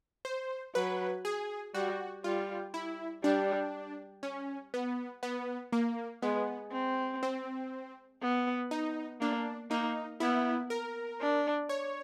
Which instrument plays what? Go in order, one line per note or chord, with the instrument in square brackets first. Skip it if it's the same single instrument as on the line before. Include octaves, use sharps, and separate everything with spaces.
[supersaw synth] C5
[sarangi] F#3 [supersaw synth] B4
[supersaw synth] G#4
[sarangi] G3 [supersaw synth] F#4
[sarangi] G3 [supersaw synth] F4
[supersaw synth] E4
[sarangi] G3 [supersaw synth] D4
[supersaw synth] C#4
B3
B3
A#3
[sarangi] G#3 [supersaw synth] B3
[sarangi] C4
[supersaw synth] C4
[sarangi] B3
[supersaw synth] D#4
[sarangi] A#3 [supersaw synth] D4
[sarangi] A#3 [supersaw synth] D#4
[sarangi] B3 [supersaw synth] E4
[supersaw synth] A#4
[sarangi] D4
[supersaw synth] C#5